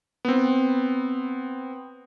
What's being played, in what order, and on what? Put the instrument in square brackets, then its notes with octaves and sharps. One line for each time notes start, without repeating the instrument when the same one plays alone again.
[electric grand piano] B3 C4